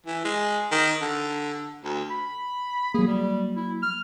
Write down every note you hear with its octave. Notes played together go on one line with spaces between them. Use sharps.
E3
G#3
D#3
D3
D2
B5
F#3 A#3 G#4
G3
E4
F6